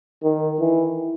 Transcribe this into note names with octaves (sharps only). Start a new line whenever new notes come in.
D#3
E3